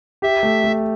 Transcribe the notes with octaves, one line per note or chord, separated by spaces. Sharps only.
G4 E5
A3
A3